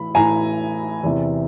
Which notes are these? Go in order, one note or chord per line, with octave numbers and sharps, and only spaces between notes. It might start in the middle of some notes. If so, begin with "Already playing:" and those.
Already playing: A2 E3 B5
A2 E3 G#5 A#5
E2 C3 E3